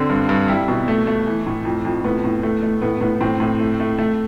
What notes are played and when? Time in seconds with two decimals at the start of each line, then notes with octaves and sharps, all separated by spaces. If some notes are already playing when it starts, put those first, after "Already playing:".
Already playing: D3 C4
0.09 G2
0.29 G2
0.48 G3 E4
0.68 B2
0.88 A3
1.07 A3
1.26 E3
1.47 A2
1.65 F2
1.85 F2
2.04 A2 B3
2.24 A2
2.43 A3
2.63 A3
2.82 A2 B3
3.01 A2 B3
3.21 A2 C4
3.40 A2
3.60 A3
3.80 A3
3.98 A3